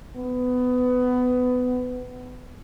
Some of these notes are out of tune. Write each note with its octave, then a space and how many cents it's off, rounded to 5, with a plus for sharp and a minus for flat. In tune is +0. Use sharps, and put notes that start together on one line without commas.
B3 +20